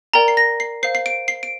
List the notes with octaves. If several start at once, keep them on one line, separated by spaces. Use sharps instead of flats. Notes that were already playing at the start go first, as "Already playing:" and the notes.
A#4 D5 G5 A#5
C7
A#6
C7
C5 F5 C7
C7
D7
C7
D7